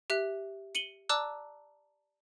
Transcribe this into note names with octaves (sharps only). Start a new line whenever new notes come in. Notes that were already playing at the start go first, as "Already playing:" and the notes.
G4 E5 F#6
C#7 D#7 F#7 G7
D5 A5 A#5 D6 E6 F#6